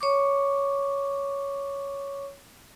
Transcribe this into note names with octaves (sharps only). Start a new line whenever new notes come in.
C#5 C#6 D6